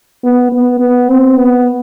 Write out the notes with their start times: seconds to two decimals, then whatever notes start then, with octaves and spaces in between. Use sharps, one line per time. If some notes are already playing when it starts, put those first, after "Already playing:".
0.24 B3
0.52 B3
0.80 B3
1.09 C4
1.37 B3